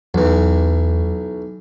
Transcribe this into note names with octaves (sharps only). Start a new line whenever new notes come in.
B1 E2 E3 F#3